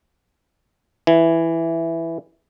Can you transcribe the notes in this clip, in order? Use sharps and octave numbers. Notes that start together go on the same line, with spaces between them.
E3